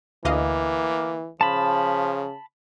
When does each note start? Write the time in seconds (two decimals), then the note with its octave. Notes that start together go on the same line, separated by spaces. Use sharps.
0.25 D2 E3 A#3 D#5 F5
1.41 C#3 F3 A5 B5